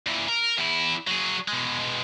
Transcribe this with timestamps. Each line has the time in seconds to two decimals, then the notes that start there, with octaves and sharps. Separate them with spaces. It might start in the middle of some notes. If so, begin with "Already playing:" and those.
0.07 A#2 E3
0.28 A#4
0.58 E2 E4
1.07 F#3 G#4
1.48 B2 G#3